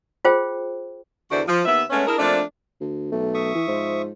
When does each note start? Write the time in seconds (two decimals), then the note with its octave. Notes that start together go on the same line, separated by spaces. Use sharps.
0.25 F4 G#4 C5 G5
1.31 E2 D3 E3 F#4 C5 D5
1.47 F3
1.66 D#2 B3 B4 E5
1.90 G#3 A3 B3 C#4
2.06 D4 E4 G#4 A#4
2.19 F3 A3 A#3 C4 D4
2.80 D2
3.12 B1 A3
3.34 E5 C#6 D#6
3.55 E3
3.68 G#2 F3